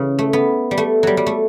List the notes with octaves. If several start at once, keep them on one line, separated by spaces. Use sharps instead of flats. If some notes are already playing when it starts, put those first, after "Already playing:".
Already playing: C#3 E3
A3
B3
G3
A3
F#3 G3
G3
A3